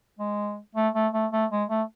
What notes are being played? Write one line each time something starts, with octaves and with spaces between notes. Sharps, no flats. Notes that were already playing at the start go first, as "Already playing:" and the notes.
G#3
A3
A3
A3
A3
G#3
A3